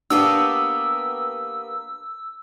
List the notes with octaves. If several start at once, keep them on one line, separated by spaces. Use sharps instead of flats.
A#3 B3 D4 G4 E6